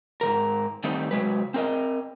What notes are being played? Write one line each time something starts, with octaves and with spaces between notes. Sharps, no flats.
G#2 B2 A#4
D#3 G3 A3 C4 D#4
C3 F#3 G#3 B4
C4 A#4 D#5